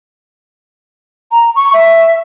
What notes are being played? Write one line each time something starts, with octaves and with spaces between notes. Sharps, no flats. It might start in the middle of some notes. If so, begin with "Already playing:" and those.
A#5
C#6
E5